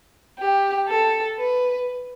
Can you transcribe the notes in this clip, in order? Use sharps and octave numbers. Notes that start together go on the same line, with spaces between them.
G4
A4
B4